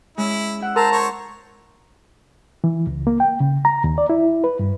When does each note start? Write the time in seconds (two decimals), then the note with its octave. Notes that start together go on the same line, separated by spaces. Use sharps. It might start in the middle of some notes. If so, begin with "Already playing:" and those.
0.18 G#3 C#4 E4
0.60 E4 F#5 E6
0.76 A#4 C5 A5 A#5
0.92 C5 C#5
2.64 E3
2.87 C#2
3.07 A#3
3.20 G5
3.40 C#3
3.65 A#5
3.84 D#2
3.98 D5
4.10 E4
4.44 B4
4.59 G2